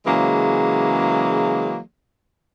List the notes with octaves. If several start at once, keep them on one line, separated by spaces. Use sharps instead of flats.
C#3 E3 F#3 G#3 A#3